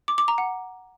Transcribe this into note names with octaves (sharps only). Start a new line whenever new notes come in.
D6
D6
A#5
F#5